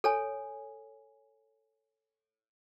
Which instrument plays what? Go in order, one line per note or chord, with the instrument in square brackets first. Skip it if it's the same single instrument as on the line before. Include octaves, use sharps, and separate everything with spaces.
[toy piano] A4 C#5 G#5